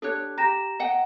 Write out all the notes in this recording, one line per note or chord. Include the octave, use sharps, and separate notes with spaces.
D4 G4 A4 C#5 F#6
G4 A#5 A#6 E7
D#5 F#5 G5